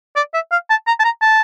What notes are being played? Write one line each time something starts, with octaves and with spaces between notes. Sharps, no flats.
D5
E5
F5
A5
A#5
A5
A#5
A5